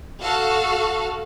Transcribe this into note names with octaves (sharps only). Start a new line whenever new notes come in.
F#4 A4 F5